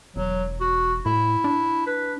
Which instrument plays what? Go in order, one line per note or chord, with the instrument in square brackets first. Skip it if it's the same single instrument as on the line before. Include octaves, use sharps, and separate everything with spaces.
[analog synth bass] E1 [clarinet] F#3
[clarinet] F#4
[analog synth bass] A2 [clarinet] E4
[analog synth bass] D4
[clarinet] B4